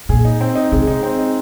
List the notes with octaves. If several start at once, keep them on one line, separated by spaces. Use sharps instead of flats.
A#2 G#4
D#4
C4
D#4
C3 G#3
D#4
C4
D#4